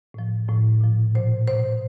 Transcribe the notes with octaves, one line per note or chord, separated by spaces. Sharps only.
A2 F3
A2 F3
A#2 F3
A#2 F3 C5
B2 C5